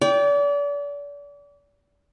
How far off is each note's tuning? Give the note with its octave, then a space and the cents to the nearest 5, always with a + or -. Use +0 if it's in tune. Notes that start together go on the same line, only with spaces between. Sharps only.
D5 -35 G5 +0